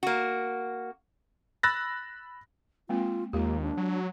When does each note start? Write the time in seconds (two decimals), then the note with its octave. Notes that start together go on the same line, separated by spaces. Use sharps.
0.03 A#3 F#4
1.63 B5 E6 F#6 A6 A#6
2.89 G#3 A#3 C4 F4
3.33 D#2 G#3 A#3 F4 G4
3.62 D4
3.77 F#3